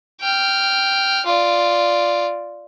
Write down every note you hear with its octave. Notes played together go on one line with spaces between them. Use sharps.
G5 F6
F4 D5